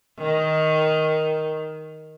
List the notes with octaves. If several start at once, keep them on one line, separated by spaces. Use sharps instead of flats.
D#3